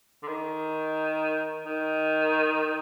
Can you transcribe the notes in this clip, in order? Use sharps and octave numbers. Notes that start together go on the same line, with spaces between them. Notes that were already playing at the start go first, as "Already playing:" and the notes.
D3
D#3
D#3